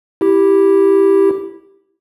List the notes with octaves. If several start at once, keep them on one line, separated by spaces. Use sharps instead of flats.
E4 G4